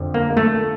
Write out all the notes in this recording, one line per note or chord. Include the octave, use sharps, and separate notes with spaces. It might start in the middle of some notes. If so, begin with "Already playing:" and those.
Already playing: F2 D3 F3
A#3
A3